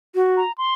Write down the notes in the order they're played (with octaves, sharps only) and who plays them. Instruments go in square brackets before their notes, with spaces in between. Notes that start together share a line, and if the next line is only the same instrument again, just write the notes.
[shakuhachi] F#4
[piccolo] A#5
C6